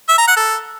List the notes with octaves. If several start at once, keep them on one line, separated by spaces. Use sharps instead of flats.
E5
A#5
F#5
A4